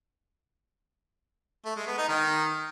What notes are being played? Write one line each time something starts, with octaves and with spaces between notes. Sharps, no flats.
A3
G#3
B3
D#4
D#3